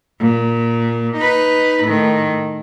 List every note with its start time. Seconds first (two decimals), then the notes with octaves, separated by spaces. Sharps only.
0.20 A#2
1.16 D#4 B4
1.83 A2 D#3